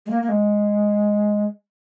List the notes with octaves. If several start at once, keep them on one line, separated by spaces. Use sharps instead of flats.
G#3
A#3
A#3
G#3